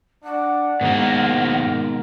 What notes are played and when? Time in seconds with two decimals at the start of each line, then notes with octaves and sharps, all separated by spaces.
0.24 D4 F#5
0.81 G#2 B2 D#3 G#3 A#3 A#4